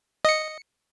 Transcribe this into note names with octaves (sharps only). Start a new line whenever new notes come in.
D#5 C#7